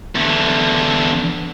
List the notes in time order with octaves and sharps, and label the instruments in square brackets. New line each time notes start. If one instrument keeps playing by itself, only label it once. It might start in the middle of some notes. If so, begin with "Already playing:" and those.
[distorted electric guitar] E2 D3